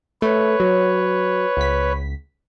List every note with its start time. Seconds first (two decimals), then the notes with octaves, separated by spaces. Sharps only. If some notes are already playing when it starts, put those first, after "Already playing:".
0.22 A3 B4 C#5
0.60 F#3
1.57 C#2 B6